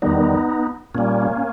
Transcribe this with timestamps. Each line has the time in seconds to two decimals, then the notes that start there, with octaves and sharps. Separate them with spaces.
0.02 E2 D#3 G3 B3 D#4
0.94 A#2 G3 A#3 C#4